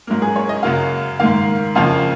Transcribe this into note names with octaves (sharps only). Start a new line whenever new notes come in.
G#2 F#3 A#3 A#4
G#4
C#5
D#5
F#2 C#3 F#3 A#3 F5
G#2 D#3 A#3 F5
F2 C#3 F3 A#3 F5